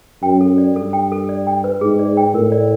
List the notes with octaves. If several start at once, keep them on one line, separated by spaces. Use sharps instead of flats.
F#2 G5
A4
D5
G2 A4
G5
A4
D5
G5
B4
G#2 G#4
D5
G5
A2 A#4
D5